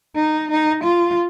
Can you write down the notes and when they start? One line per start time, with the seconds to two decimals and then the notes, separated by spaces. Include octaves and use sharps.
0.15 D#4
0.51 D#4
0.83 F4